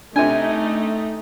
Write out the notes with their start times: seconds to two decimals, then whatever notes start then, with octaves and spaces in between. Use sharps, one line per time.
0.16 C3 A3 D4 D#4 G#5